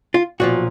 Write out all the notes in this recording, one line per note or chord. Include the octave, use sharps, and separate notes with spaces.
F4
B1 A#2 F3 F#4